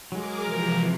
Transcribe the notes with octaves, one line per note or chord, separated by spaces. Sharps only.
F#3 G#3 G#4 A#4 D6
C3 E3 F3 A#4